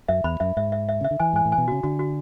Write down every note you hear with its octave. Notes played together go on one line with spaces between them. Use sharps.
F#2 E5
E2 B5
F#2 E5
G#2 E5
E5
E5
C#3 E5
D3
E3 G#5
G#2 G#5
A2
G#5
B2
C#3 F#4
D3 F#4
F#4